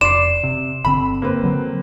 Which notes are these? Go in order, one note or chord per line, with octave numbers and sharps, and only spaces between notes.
F1 D5 C6 C7 E7
C3
G1 D3 C4 B5
A#3 C4 B4
D3 F#3